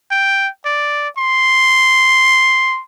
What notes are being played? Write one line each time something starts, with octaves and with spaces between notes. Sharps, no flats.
G5
D5
C6